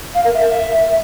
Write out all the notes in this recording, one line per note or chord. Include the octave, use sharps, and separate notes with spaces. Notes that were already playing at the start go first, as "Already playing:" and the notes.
F5
A#4
E5